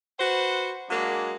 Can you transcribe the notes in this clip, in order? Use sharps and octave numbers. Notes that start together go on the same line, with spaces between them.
F#4 B4 C5 F#5
F#3 G#3 A#3 D4